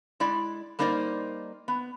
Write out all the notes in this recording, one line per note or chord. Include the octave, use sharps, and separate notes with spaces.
G#3 E4 D5
G3 A#3 D#4 C5 D5 D#5
B3